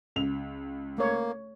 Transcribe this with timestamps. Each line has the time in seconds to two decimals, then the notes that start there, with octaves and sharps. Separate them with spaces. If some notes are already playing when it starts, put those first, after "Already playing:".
0.16 C#2 F7
0.98 A3 A#3 C#5